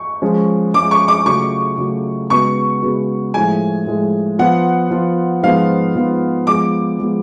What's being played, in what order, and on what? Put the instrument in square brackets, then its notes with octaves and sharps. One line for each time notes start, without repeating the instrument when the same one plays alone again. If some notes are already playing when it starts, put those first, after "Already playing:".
Already playing: [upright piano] C#6
[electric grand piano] F3 G#3 C#4
[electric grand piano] F3 G#3 C#4 [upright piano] D6
[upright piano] C#6
D6
[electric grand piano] C#3 F#3 A3 F4 [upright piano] C#6
[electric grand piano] C#3 F#3 A3 F4
[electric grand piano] C#3 G#3 B3 F#4 B4 [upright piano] C#6
[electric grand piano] C#3 G#3 B3 F#4 B4
[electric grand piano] A2 F3 G#3 [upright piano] G#5
[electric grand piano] A2 F3 G#3
[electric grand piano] F3 B3 F4 [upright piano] F#5
[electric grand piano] F3 B3 F4
[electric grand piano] G#2 F3 B3 F4 [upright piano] F5
[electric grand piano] G#2 F3 B3 F4
[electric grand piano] F3 G#3 B3 F4 [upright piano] D6
[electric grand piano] F3 G#3 B3 F4